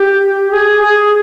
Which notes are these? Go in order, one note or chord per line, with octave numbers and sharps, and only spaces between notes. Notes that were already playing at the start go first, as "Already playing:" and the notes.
Already playing: G4
G#4
G#4